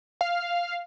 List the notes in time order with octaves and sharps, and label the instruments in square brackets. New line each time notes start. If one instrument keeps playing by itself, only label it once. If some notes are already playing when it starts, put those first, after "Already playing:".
[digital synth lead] F5